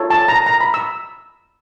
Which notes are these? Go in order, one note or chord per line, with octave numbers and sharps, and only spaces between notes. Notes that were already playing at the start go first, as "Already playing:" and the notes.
Already playing: F4 A4 C#5
A5
A#5
A#5
B5
E6